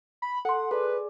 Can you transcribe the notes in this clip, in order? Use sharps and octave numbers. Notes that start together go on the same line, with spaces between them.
B5
A4 F#5 C6
G#4 B4 D5